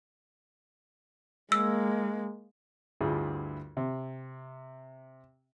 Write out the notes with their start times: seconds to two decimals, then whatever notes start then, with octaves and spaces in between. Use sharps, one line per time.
1.52 G#3 A#3 E6
3.01 D2 G2 E4 F4 G#4
3.77 C3